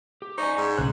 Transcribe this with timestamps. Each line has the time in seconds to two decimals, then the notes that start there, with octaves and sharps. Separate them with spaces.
0.22 G4
0.38 D#4 C5 D5 G#5 C#6
0.57 G#2
0.78 B1 C#3 A3 G#4 C5 F#6